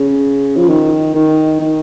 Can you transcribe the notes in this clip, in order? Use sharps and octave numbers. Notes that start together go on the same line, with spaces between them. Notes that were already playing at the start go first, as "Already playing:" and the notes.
Already playing: C#3
F3
D#3
D#3
D#3